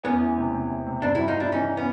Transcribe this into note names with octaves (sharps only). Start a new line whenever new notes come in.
E2 B3 C#4
E3
C3
C3
C3
C3
G2 C4 D4
G2 E4 F#4
D#4 F4
G3 D4 E4
E3 C#4 D#4
B3 C#4